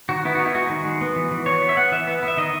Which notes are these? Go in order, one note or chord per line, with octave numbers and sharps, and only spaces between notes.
D#3 F#4
B3 E4
D#4 F#4
E4
G#3 F#4
D#3
G#3
B3
E3
E3
B3 C#5
B3
E5
B3 F#5
E3 E5
B3
B3
E5
D#3 D#5